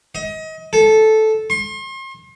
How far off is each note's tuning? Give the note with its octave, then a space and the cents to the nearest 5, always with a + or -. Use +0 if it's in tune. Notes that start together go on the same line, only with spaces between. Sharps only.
D#5 +30
A4 -10
C6 +40